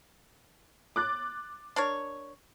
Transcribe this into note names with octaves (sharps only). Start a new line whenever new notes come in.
D6 F#6 A6
D4 A#4 C#5